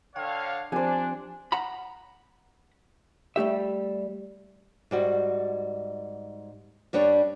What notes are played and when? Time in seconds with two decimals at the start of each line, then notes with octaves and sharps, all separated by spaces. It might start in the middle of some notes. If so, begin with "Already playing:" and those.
0.16 D3 C#5 F5 G5
0.72 F3 C4 D4 G4 C5 G#5
1.52 F#5 A#5 B5
3.36 G3 A3 G4 E5
4.91 G#2 G3 F#4
6.93 G2 G3 D4 C#5